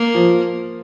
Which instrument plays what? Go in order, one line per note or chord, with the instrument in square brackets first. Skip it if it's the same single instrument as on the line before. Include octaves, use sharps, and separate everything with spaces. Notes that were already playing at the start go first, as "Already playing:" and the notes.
Already playing: [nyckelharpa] A#3
[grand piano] F3